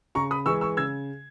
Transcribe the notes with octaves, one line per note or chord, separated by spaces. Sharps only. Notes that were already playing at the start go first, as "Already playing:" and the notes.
C#3 A#5 C#6
B5 D#6
E3 G#3 C#6 E6
C#6 E6
C#3 E6 G#6